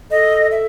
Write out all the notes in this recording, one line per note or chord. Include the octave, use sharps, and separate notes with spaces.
A4 D#5
E5